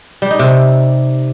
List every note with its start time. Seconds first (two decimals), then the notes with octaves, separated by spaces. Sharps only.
0.22 G3
0.31 D#4
0.39 C3